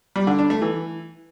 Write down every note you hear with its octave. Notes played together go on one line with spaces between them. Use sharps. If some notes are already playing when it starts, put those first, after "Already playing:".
G3
D3
D4
A3
E3